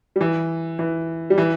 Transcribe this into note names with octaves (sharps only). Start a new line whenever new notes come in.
G3
E3
E3
G3
E3